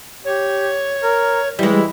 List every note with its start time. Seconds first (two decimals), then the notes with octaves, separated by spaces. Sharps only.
0.25 G4 C#5
1.03 A#4
1.59 E3 G3 G#3 E4